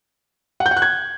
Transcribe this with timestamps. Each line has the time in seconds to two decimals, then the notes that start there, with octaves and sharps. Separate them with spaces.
0.60 F#5
0.66 G6
0.71 F#5
0.77 F#6
0.82 G#6